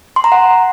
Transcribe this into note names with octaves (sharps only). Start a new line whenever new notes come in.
C6
A#5
F#5